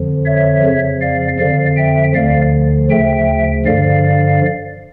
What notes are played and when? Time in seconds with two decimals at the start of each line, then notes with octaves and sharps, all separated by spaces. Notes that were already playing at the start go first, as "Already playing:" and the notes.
Already playing: F2 D3 F3
0.25 C#5 E5
0.63 F2 C#3 F3
1.01 D5 F5
1.39 F2 D3 F3 D5 F5
1.76 E5 G5
2.14 D2 D3 F3 D5 F5
2.90 D2 C#3 F3 E5 G5
3.66 G2 D3 F3 D5 F5